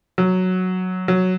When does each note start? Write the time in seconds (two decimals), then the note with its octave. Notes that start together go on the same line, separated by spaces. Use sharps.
0.18 F#3
1.08 F#3